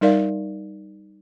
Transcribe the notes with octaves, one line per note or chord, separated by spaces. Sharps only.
G3 D#4 A#4 D5 F5